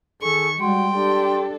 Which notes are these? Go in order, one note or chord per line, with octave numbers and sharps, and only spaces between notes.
D#3 G#4 A4 C#6
G3 G#3 F#4 G5 C6
D4 G4 A4